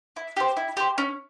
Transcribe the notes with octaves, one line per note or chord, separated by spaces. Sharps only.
E4
G4 C5
E4
G4 C5
C#4